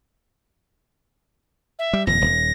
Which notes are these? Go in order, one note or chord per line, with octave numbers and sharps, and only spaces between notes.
E5
G3
D#1 F2 A#6
D#1